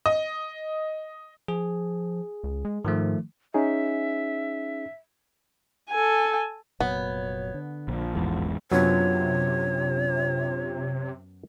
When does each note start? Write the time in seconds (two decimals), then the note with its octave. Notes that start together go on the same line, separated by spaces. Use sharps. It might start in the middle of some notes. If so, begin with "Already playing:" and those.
0.06 D#5
1.48 F3 G#4
2.44 C#2
2.65 G#3
2.85 G#2 D#3 F3 A3
3.54 C#4 D#4 G#4 E5
5.90 A4 G#5
6.80 F1 A#2 F#3 B3 C#5
7.54 D3
7.88 A#1 F3
8.15 E1 A1 E2 G#2
8.72 F#2 C3 F#3 B3 D4 F4 C5 C#5